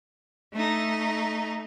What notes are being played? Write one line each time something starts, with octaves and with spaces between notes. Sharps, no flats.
A3 D#4